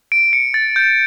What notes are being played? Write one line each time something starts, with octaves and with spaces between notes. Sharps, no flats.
D7
C#7
A6
G6